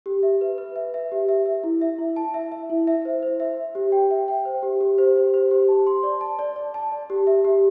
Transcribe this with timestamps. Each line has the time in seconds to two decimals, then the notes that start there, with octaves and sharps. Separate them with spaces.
0.06 G4
0.23 E5
0.41 B4
0.58 B4
0.76 E5
0.94 E5
1.12 G4
1.29 E5
1.46 E5
1.64 E4
1.81 E5
1.98 E4
2.16 A5
2.34 E5
2.52 E5
2.70 E4
2.87 E5
3.05 C5
3.22 C5
3.40 E5
3.57 E5
3.75 G4
3.92 G5
4.11 E5
4.28 G5
4.45 C5
4.63 G4
4.81 G4
4.98 C5
5.16 G4
5.34 C5
5.51 G4
5.68 A5
5.87 C6
6.03 D5
6.21 A5
6.39 D5
6.56 D5
6.74 A5
6.92 D5
7.10 G4
7.27 E5
7.45 G4